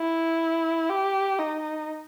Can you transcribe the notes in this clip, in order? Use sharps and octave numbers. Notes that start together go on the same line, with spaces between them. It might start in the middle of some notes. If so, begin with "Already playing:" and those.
Already playing: E4
G4
D#4